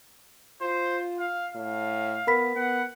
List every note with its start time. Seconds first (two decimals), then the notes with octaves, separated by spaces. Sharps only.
0.61 F4 C5
1.20 F5
1.55 A2 F5
2.27 B3 A#4 B5 B6
2.56 B3 F#5